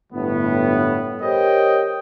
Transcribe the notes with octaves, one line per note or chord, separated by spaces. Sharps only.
G1 A2 B3
G4 A#4 C5 C#5 D#5 G5